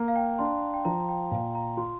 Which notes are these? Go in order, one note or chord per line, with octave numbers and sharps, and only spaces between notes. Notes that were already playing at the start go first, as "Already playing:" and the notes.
Already playing: A#3 A#5
F5
G5
D4 C6
G5
F3 A#5
A#5
G5
A#2 F5
A#5
F4 C6